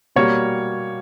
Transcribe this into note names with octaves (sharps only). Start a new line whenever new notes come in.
B2 G3 A#3 C#5